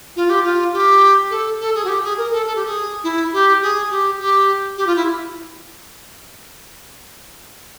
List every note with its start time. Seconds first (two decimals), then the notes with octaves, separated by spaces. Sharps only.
0.16 F4
0.30 G4
0.44 F4
0.73 G4
1.30 A4
1.60 A4
1.75 G#4
1.84 F#4
1.88 G4
2.03 G#4
2.18 A#4
2.32 A4
2.46 A4
2.56 G4
2.66 G#4
3.04 E4
3.33 G4
3.62 G#4
3.91 G4
4.20 G4
4.77 G4
4.87 F4
4.96 E4